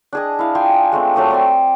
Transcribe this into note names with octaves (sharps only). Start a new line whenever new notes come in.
D4 G#4 D#5
E4 F5
F4 G#4 G5 G#5
G#3 A3 C4
F#3 A3 D5 D#6
C4 D5 G#5